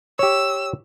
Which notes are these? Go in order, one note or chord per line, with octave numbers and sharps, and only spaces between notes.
G4 C#5 E6